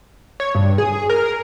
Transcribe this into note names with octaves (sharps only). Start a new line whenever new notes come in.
C#5
G2
G#4
A#4